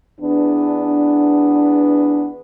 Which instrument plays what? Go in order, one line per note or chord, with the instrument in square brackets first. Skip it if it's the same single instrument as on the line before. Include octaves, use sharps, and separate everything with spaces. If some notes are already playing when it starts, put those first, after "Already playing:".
[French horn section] E2 B3 D4